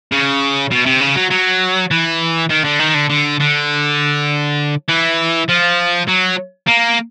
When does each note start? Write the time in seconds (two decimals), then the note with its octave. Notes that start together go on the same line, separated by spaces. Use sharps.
0.12 C#3
0.71 B2
0.86 C3
1.01 C#3
1.16 F#3
1.31 F#3
1.91 E3
2.50 D#3
2.65 D3
2.79 D#3
2.95 D3
3.10 D3
3.40 D3
4.89 E3
5.48 F3
6.08 F#3
6.67 A#3